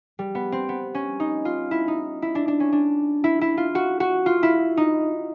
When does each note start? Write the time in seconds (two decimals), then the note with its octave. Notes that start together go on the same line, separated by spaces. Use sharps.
0.19 G3
0.35 B3
0.52 C4
0.69 B3
0.95 C#4
1.20 D#4
1.45 F4
1.71 E4
1.88 D#4
2.22 E4
2.35 D4
2.48 D4
2.60 C#4
2.72 D4
3.24 E4
3.41 E4
3.57 F4
3.75 F#4
4.00 F#4
4.26 F4
4.43 E4
4.77 D#4